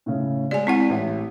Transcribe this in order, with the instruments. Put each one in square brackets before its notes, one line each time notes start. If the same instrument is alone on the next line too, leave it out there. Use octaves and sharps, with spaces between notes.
[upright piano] A2 C#3
[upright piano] G#3 [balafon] D5 G#5
[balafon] C4 E4 F#5
[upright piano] A1